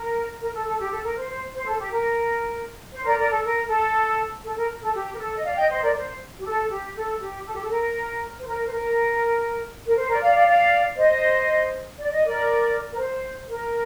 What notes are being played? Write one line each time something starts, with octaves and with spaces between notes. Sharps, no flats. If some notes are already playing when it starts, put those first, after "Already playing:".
Already playing: A#4
A#4
A4
A4
G4
A4
A#4
C5
C5
C5
A4
G4
A#4
C5
A#4 D5
A#4 D5
A4
A#4
A4
A4
A#4
A4
G4
A#4
A4
D#5
D5 F5
D#5 G5
C5 D#5
A#4 D5
C5
G4
A4
G4
A4
G4
A4
G4
A4
A#4
C5
A#4
C5
A#4
A#4
C5
A#4 D5
D5 F5
D5 F5
D5 F5
C5 D#5
D5
D#5
A#4 D5
A#4
C5
A#4